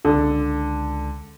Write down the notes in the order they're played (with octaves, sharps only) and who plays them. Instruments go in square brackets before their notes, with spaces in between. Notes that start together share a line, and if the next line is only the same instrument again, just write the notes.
[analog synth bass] C#2 [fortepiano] D3